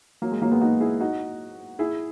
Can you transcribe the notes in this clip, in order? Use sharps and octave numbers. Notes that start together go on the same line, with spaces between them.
F#3 A#3
G#3
F#3 A#3
G#3 B3
D#4 F#4
E4 G#4
D#4 F#4
E4 G#4